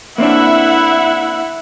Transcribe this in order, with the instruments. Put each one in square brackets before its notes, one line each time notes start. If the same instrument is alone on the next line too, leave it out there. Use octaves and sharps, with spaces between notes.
[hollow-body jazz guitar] A#3 C4 D4 [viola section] E4 E5 F#5